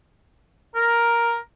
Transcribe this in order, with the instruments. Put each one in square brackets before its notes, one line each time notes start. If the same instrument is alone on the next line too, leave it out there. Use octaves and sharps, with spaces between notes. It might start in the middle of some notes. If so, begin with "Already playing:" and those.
[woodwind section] A#4